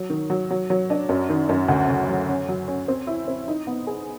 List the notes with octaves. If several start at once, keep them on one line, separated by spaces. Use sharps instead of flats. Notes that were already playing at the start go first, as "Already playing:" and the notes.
Already playing: F#3
D#3
F#3
F#3
F#3
D4
F#2
D#3
F#2
D2
C#3
F#3
C#4
F#3
C#4
C4
E4
C4
D#4
B3
G#4